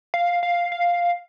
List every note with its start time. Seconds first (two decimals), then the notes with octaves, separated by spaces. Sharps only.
0.14 F5
0.43 F5
0.72 F5